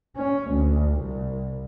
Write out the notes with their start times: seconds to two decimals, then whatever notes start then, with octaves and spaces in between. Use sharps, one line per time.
0.17 C#4
0.51 D2
1.00 C2